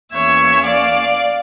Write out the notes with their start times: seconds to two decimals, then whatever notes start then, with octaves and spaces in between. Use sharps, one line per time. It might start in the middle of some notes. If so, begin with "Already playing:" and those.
0.13 E2 E3 A#3 C#4 C#5 E5
0.66 D5 F5